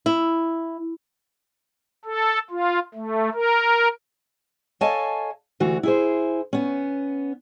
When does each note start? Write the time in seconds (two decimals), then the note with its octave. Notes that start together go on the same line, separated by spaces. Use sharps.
0.06 E4
2.05 A4
2.50 F4
2.94 A3
3.34 A#4
4.81 A4 C#5 D#5 F5 G#5 A5
5.60 D2 E3 F#4
5.83 E4 G#4 C5
6.53 B3 C#4